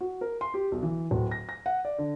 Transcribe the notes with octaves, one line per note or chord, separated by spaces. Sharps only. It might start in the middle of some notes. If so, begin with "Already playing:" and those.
F#4
A#4
C6
G4
B1
E3
D1
A#6
A#6
F#5
D5
D3